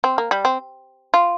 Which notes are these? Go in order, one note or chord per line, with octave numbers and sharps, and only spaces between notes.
C4
A#3
G3
C4
F4